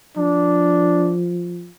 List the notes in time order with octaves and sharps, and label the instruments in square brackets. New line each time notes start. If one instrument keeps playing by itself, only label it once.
[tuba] F3 [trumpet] D4